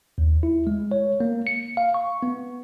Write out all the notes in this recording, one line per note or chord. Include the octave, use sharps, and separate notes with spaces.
D#2
E4
G#3
C#5
A#3
C#7
F5
C#6
B3